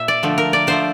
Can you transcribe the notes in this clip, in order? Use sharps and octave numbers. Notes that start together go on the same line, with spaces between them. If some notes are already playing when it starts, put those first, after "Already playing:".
Already playing: A#2 E5
D5
D3 F3 A3
A#4
D5
D3 F3 A3 C5